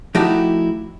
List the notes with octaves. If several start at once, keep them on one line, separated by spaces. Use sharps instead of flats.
F3 A3 D#4 E4 F#4 G4